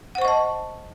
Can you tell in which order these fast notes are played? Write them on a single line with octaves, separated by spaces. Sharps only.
F#5 C5 C#6 D#5 A5